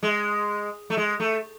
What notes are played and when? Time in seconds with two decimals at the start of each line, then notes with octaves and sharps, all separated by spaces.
0.03 G#3
0.90 A3
0.97 G#3
1.20 A3